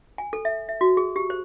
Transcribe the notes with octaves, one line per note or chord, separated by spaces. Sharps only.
G#5
A4
E5
E5
F#4
G#4
G4
C5